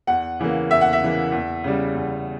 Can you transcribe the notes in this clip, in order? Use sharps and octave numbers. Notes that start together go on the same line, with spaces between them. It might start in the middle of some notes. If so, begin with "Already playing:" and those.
E2 F#5
C#3 E3 A#3
E2 E5
F#5
E5
C#3 E3 A#3
E2
C#3 G3
E2